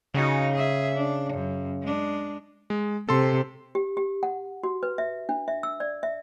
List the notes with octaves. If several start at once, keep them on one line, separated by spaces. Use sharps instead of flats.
C#3 D#4 F#4
G#4 E5
D4
F#2
G#3 D4
G#3
C3 A4 C6
G4
G4
F#5
F#4
B4
E5
D4
E5
E6
D5
E5